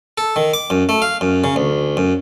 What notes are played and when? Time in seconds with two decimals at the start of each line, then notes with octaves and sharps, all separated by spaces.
0.18 A4
0.36 D#3
0.54 D6
0.70 F#2
0.89 A3
1.02 F5
1.21 F#2
1.44 C#3
1.56 D2
1.97 F#2